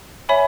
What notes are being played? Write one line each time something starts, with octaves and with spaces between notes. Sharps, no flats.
C#5 E5 G#5 B5